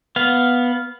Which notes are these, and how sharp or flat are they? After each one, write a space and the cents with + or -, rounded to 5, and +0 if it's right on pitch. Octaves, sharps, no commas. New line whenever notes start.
B3 +0 F5 +0